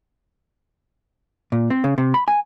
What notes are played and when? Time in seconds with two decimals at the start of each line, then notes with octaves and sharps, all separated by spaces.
1.52 A#2
1.70 C4
1.84 C#3
1.98 C3
2.14 B5
2.28 G#5